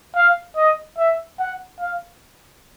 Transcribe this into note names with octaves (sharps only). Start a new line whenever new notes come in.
F5
D#5
E5
F#5
F5